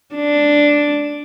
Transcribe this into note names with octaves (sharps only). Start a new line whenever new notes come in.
D4